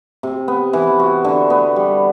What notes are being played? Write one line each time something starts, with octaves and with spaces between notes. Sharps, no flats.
C3
B3
E3
F#4
D3
B3
G3